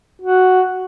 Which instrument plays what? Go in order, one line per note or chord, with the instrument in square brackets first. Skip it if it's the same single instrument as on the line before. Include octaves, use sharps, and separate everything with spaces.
[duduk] F#4